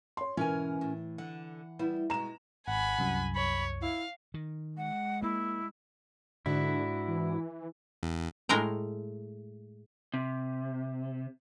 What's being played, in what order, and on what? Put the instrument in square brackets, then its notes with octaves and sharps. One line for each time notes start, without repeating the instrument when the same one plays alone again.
[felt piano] C#5 C6
[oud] G#2 B2 [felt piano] E3 [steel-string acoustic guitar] C#4 A#4 G#5
[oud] A2
[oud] D3 [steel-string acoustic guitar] F#5
[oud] G3 B3 E4
[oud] B2 G#3 [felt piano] A#5 E7
[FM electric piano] G#1 [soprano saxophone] F#5 [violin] G#5 B5
[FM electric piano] C2 F#2
[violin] C#5 [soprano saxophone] B5
[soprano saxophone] E4 [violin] F5
[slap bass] D#3
[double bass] G#3 [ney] F#5
[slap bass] A#3 [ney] E4
[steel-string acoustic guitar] G#2 D4 F#4 [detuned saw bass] D3 [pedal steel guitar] E4
[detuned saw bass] E3
[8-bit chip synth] E2
[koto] A2 G#3 A#4 G5 A#5
[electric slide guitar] C3